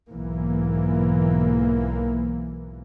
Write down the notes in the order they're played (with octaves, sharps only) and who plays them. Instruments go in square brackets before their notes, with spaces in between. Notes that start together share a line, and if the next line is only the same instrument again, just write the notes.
[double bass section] B1 G#2 E3 A#3